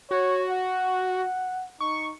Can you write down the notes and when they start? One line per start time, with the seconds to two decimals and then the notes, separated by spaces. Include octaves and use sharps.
0.11 F#4 C#5
0.49 F#5
1.80 D#4 C#6